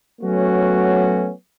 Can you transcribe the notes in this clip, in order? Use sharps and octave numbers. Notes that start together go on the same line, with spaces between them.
F#3 A3 B3 C#4 F#4